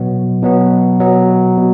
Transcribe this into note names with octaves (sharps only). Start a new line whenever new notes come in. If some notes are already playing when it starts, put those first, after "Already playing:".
Already playing: B2 F#3 B3
B2 F#3 B3
B2 F#3 B3
B2